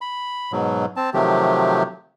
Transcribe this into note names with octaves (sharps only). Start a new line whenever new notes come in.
B5
G#2 B2 F#3
C4 A5
C3 D#3 F3 F#3 A3 G4